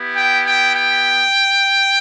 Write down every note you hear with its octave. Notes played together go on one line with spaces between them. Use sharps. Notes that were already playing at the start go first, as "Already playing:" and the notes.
Already playing: B3 E4 G4
G5
G5
G5